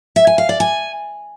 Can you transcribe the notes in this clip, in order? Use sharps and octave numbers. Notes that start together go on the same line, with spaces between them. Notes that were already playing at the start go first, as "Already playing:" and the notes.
E5
G#5
F5
D5
G#5